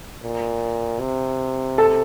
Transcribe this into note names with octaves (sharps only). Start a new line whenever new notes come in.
A#2
C3
A4